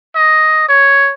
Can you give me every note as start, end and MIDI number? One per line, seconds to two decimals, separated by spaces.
0.15 0.64 75
0.68 1.12 73